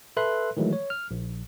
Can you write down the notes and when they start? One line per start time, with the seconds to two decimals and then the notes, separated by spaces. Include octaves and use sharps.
0.17 A4 B4 E5 C6 F#6
0.57 D#3 E3 F#3 G#3 A3
0.73 C#5
0.90 F6
1.11 A#1